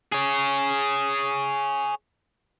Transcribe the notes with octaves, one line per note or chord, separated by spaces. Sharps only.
G#4 C#5